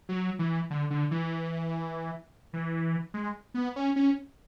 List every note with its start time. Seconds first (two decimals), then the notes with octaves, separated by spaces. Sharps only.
0.09 F#3
0.39 E3
0.70 D3
0.90 D3
1.11 E3
2.53 E3
3.14 G#3
3.54 B3
3.76 C#4
3.96 C#4